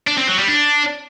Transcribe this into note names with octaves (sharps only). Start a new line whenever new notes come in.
D4
C4
F#3
G3
D4